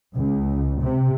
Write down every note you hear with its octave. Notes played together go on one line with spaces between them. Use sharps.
C#2
C3